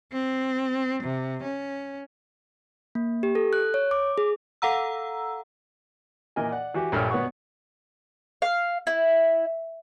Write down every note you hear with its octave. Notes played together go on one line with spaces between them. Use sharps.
C4
C3
C#4
A#3
G4
A4
F#6
C#5
D6
G#4
A4 F5 F#5 A#5 E6
A#2 E3 A#4 D#5 G#5
D5 F#5
E3 F#4 G4
A#1 G2 A4 C#5 F6
B2 B3 C#5 F#5 C#6
F5
E4